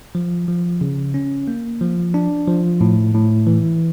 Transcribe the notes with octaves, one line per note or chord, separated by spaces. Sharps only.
F3
F3
C#3
C#4
A#3
F3
D4
F3
A2
A2
E3